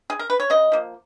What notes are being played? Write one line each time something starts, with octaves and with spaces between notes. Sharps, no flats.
G#4
A#4
B4
C#5
C#3 D#5
F3 A#3